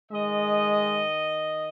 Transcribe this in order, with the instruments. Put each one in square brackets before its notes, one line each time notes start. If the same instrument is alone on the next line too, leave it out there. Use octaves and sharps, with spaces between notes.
[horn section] D#3 D#5 [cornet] G#3